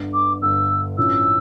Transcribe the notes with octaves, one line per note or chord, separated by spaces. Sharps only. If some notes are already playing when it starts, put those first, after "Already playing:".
Already playing: G1 G2 D3
D6
G1 G2 D3 E6
A1 G2 F3 C#4 E4 E6